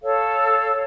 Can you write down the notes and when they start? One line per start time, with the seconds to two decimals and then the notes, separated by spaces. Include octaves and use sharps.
0.02 A4 C#5 F5